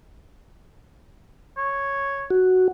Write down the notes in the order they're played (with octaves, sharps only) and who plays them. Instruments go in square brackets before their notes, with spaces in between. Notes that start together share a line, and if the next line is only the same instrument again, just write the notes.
[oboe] C#5
[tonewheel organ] F#4